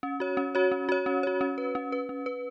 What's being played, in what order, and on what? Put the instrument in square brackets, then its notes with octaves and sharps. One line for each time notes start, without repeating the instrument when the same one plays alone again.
[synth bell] C#4
F#4 C#5
C#4
F#4 C#5
C#4
F#4 C#5
C#4
F#4 C#5
C#4
B4
C#4
B4
C#4
B4